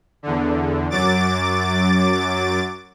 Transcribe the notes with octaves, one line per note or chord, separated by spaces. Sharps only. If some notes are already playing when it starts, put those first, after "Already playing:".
E2 D3
F#2 F#3 D6 A6